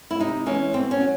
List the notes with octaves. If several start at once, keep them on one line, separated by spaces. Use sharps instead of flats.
E4
C3 D#4
E3 G#3 C#4
B2 C4
C#4
F#3